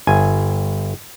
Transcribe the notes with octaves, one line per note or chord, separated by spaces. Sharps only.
G1 G#5